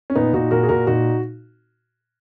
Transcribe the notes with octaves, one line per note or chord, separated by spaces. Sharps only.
C#4
A#2 B3 D#4
A#2 D#4 F#4
A#2 F#4 A#4
G#4
A#2 F#4 A#4
A#2 D#4 F#4